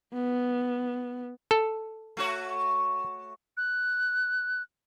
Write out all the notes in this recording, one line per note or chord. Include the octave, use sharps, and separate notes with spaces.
B3
A4
A3 F#4 C#5
F#6